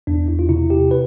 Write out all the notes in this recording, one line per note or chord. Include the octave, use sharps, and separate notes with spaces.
E2 D4
E4
F4
C3 E4
G4
B4